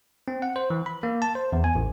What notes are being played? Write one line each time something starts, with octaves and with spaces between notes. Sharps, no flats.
C4
F#5
C5
E3
B5
A#3
A5
C5
E2
G#5
A1